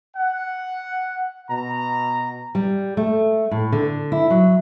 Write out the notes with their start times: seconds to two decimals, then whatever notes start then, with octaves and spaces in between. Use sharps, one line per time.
0.17 F#5
1.49 B2 A#5
2.55 G3
2.97 A3
3.51 A2
3.72 D3
4.12 E4
4.30 F#3